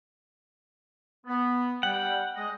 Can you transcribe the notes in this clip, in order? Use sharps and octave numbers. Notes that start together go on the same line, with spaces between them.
B3
G3 F#5 G5
G#3 D#5